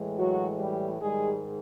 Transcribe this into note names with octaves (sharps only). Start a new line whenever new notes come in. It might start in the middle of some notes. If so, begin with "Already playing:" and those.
Already playing: A2 E3 G#3
F#3 F#4
G3 G4
G#2 D#3 G3 G#3 G#4